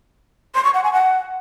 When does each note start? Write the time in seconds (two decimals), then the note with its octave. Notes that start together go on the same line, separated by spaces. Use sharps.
0.55 C6
0.64 C#6
0.74 F#5
0.83 G#5
0.93 F#5